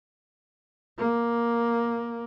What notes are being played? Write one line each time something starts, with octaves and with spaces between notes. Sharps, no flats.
A#3